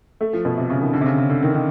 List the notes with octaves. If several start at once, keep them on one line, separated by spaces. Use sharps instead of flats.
A3
F3
B2
C3
C#3
D#3
D3
C3
C#3
C#3
D3
D#3
D#3